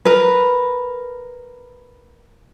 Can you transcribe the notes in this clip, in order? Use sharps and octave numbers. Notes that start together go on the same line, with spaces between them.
A#4 B4